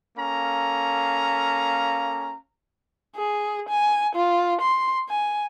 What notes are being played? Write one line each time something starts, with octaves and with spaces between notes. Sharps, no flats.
A#3 C#4 A4 F5 A#5
G#4
G#5
F4
C6
G#5